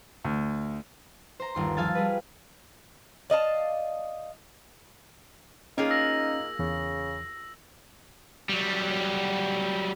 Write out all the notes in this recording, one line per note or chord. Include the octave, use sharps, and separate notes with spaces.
D2
C5 A#5
G1 D#2 C6
F3 A4 F5 G#5 A5 A6
G3 G#4 B4
D5 D#5 F5 A5
A#3 C#4 D#4 F4 G#4
E6 A#6
E2 C#3
F#3 G3